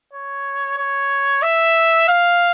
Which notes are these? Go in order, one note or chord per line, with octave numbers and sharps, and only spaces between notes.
C#5
C#5
E5
F5